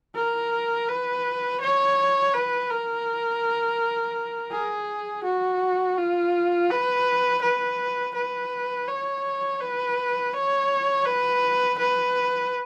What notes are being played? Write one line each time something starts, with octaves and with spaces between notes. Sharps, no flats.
A#4
B4
C#5
B4
A#4
G#4
F#4
F4
B4
B4
B4
C#5
B4
C#5
B4
B4